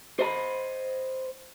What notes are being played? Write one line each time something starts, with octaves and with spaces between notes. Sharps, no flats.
C5 D#5 A#5 B5